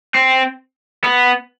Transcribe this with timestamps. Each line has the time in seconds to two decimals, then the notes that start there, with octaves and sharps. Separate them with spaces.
0.14 C4
1.04 B3